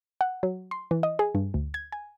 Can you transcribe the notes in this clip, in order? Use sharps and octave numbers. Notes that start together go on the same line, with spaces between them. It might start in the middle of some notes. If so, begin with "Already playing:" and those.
F#5
F#3
C6
E3
D#5
G#4
G2
D2
G#6
G#5